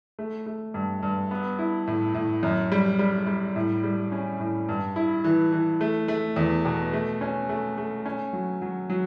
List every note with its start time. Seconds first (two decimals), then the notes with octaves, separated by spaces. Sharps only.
0.19 A3
0.46 A3
0.74 G2
1.03 G2
1.31 B3
1.59 E4
1.87 A2
2.14 A2
2.43 F#2
2.72 G3
2.99 G3
3.27 G3
3.56 A2
3.84 G3
4.12 C#4
4.40 A2
4.69 G2
4.96 E4
5.24 E3
5.53 E3
5.81 A3
6.08 A3
6.36 E2
6.65 B2
6.93 A3
7.21 C#4
7.49 A3
7.78 A3
8.06 C#4
8.33 F#3
8.62 F#3
8.90 F#3